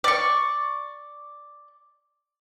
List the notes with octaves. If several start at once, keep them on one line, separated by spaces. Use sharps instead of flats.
D5 C#6